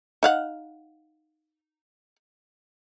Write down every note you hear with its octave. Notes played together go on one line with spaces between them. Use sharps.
D#4 F5 F#5